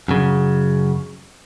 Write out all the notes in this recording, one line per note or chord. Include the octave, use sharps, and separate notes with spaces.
F#2 C#3